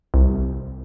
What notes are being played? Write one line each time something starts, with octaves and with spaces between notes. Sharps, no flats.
C2